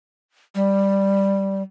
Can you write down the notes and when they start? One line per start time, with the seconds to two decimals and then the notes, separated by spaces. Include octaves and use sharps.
0.55 G3